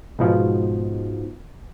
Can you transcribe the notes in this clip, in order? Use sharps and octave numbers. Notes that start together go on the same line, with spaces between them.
G#2 B2 F3